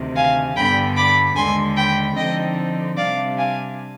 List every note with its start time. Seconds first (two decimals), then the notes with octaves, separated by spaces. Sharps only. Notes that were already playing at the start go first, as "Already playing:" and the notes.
Already playing: D2 C3 D#3
0.16 F5 G#5
0.56 G2 D3 G3 B3 G5 B5
0.96 B5 D6
1.36 D#2 D3 G#3 G#5 C6
1.77 G5 B5
2.16 D3 F3 C4 D#4 D#5 G5
2.97 C3 G3 D4 D5 F5
3.38 F5 G#5